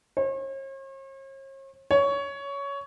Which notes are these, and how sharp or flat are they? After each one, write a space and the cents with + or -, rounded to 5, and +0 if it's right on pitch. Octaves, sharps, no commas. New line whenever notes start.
C#5 -45
C#5 +15